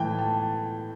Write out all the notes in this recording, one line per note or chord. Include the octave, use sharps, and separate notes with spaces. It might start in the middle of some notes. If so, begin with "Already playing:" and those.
Already playing: A2 E3 G5 A5
A5